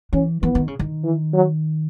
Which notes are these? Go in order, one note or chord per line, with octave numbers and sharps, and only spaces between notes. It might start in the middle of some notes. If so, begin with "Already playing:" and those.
E3 C#4
E3 B3
D#3
C#3
D#3
E3
F#3